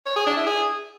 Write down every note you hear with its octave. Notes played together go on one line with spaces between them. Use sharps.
C#5
G#4
D4
E4
G#4